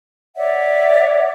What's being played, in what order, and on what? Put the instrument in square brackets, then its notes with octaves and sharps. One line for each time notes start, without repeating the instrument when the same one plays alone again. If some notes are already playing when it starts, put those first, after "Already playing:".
[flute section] C#5 D5 E5 F#5